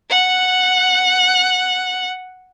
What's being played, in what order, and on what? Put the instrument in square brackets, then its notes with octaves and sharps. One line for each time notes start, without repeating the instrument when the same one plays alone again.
[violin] F#5 F#6